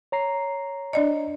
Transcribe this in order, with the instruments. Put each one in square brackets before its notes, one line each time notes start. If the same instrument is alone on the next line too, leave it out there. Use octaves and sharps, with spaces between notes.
[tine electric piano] C#5 A#5 C7
[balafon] D4 D5 D#5